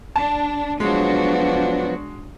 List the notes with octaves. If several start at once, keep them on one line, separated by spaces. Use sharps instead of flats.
D4 A5
F3 F#3 G#3 B3 D4 F#4